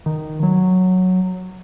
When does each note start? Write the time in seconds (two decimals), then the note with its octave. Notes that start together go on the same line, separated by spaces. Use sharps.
0.06 D#3
0.43 F#3